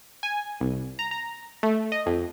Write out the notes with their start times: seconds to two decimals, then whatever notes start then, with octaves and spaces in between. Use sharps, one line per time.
0.23 G#5
0.60 C2
0.99 A#5
1.11 A#5
1.63 A3
1.92 D#5
2.06 F2